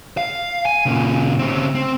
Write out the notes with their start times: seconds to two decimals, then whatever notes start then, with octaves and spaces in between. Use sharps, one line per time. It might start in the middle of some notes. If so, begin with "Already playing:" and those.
0.17 F5
0.66 G#5
0.86 A#2 C#3
1.39 C#3 C4
1.75 C4